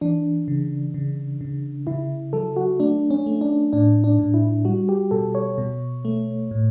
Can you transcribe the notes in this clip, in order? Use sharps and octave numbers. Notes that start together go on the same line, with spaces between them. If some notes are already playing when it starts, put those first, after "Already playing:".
E3 D4
C#3
C#3
C#3
C#3 E4
F#3 A4
F#4
A3 D4
C#4
A3
D4
A2 D4
D4
A2
E4
G3 F#4
G4
B2 A4
C#5
B2
A3
A2